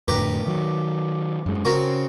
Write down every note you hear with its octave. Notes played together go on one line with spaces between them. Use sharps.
F2 A2 D3 G4 A#4 B4
D#3 F#3
F#2 G#3
C#3 C4 F#4 A#4